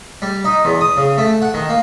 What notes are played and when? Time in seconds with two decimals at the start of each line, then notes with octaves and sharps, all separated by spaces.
0.22 G3
0.45 D#4
0.65 E2
0.81 D#6
0.97 C#3
1.18 A3
1.42 F#5
1.54 D#3
1.69 A#3